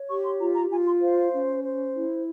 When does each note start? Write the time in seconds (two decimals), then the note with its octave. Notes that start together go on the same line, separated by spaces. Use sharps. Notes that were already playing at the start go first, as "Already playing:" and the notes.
Already playing: C#5
0.08 G4 C#6
0.24 C6
0.39 F4 A#5
0.55 A#5
0.70 F4 G#5
0.86 C6
1.01 C5 F5
1.32 C#4
1.63 C5
1.94 E4